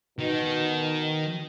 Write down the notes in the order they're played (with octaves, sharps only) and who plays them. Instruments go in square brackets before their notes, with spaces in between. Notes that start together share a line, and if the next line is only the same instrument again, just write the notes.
[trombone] B2 [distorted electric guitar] D#3